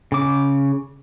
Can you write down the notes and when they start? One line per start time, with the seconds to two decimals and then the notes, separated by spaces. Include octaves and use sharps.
0.12 C#3 D6